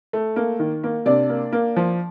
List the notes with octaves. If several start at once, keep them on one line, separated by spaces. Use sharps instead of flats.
A3
A#3
D#3
A#3
C3 D4 D5
A#3
A#3
F3